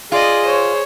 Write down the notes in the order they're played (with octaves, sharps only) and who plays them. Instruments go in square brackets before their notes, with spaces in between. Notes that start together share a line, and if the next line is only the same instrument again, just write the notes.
[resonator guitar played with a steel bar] F4 [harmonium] G#4 [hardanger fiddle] D5 D#5
[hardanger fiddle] C5 [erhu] C#5